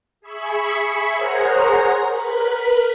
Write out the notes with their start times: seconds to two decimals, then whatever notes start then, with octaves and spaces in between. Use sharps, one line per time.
0.21 G#4 E5 B5 C#6
1.13 G#4 A#4 C5 C#5 F#5 A#5
2.09 A#4 B4 B5